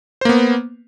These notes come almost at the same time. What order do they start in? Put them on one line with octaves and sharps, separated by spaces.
C5 A#3 B3